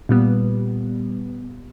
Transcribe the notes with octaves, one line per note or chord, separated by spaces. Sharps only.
A#2 G3 B3